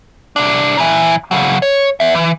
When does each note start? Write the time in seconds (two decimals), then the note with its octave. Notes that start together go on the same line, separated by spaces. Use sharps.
0.36 C2 D4
0.77 A#2 E3
1.31 C#3 F#3
1.62 C#5
2.00 B3 E5
2.15 E3